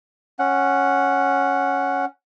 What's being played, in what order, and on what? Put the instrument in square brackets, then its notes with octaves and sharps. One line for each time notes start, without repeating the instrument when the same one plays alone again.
[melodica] C#4 F#5